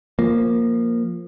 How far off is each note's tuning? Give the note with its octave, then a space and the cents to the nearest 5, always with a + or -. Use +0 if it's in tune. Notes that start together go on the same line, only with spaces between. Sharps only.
F3 +0 A#3 +0